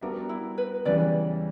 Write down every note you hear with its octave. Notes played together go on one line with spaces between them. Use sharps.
G3 B3 D4 F#4 A#4 E5
E4
B4
E2 C#3 E3 G3 B4 D5